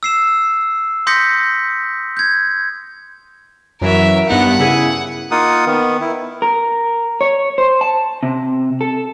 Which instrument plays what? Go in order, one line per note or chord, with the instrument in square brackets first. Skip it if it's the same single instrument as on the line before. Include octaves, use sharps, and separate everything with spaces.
[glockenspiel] E6 C7 E7
C6 D#6 G6 A#6 B6 C#7
G6 G#6
[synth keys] F#2 E3 F#3 [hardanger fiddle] A#4 E5
[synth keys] G2 B3 D#4 [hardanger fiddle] F#5
[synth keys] C#3 E4 G#4
[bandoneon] A#3 D#4 F4 F#5 D#6
D#3 B3
E4
[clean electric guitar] A#4
C#5
C5
A5
C3
A4